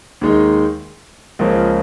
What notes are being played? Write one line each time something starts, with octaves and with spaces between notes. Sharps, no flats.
D#2 D#3 G#3 D#4
C#2 C#3 F3 A#3 C#4